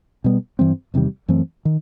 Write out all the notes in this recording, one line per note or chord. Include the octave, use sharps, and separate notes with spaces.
B2 G3 B3
G2 E3 G3 C4
E2 C3 D#3 G3
F#2 E3 A3 C4
D#3